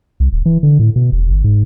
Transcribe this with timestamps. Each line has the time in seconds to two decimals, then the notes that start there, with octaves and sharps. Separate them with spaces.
0.20 C2
0.33 D1
0.46 E3
0.63 D3
0.79 A2
0.96 B2
1.12 E1
1.30 G1
1.44 G#2